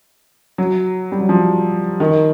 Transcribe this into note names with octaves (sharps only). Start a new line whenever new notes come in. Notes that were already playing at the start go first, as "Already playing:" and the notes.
F#3
G3
F#3
F3
D#3